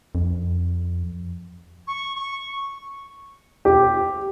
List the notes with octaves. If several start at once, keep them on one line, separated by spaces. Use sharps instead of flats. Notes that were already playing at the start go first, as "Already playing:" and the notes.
F2
C#6
C#6
G4